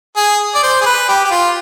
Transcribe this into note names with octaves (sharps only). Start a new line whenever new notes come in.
G#4
D5
C5
G#4
B4
G4
G4
F4